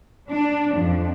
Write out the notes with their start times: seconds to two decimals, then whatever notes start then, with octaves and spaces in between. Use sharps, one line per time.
0.31 D4
0.77 F2